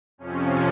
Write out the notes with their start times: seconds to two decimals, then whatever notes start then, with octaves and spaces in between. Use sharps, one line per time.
0.18 F2 C3 F3 C#4